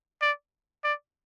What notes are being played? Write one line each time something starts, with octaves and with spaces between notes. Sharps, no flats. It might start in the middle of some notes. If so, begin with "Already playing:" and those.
D5
D5